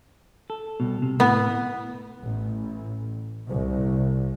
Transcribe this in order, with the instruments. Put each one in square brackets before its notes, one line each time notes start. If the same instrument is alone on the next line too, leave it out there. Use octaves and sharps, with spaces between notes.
[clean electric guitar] A4
C2 B2
C3
[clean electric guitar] A2 [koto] B3
[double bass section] A1
C2